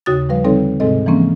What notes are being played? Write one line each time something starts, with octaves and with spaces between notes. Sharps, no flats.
D#2 C#3 F#4 D#6 A6
F3 G3 B4 F5
D3 G3 C4 D#4 A4 C#5
G#2 C3 G#3 C4 A4 D#5
E3 F3 G#3 A#3 C4 C#4